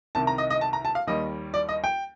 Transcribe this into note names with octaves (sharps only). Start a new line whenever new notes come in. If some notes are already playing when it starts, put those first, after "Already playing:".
C2 C3 D#3 A5
A#5
D#5
D#5
A5
A#5
A5
F5
D#2 D#3 G3 D#5
D5
D#5
G5